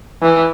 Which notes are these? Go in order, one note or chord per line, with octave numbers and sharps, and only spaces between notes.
E3